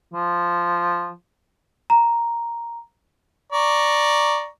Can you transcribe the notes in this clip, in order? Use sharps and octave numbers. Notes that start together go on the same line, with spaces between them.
F3
A#5
D5 A#5 C#6